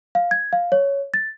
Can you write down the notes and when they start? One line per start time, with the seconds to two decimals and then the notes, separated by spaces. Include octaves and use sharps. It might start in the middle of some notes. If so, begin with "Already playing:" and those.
0.15 F5
0.31 G#6
0.53 F5
0.72 C#5
1.14 A6